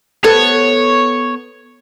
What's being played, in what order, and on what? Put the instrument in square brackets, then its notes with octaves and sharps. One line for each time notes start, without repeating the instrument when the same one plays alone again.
[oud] B3 A4 [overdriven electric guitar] C#5